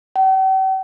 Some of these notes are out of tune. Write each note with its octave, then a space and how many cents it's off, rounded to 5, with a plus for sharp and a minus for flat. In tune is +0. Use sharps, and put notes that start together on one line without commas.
G5 -45